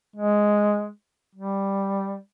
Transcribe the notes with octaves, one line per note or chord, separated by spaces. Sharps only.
G#3
G3